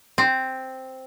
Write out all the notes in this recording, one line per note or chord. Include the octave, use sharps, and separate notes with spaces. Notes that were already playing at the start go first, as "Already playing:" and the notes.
C4